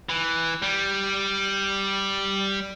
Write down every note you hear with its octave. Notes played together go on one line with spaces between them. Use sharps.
E3
G3